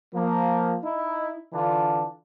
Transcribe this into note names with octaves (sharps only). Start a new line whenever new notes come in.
F3 A#3
D#4 E4
D3 E3 D4 F4